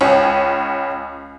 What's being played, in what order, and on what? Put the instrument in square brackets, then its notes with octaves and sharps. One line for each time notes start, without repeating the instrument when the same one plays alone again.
[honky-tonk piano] C#2 C#4